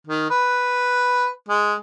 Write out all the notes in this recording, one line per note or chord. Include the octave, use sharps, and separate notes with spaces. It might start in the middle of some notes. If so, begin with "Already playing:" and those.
D#3
B4
G#3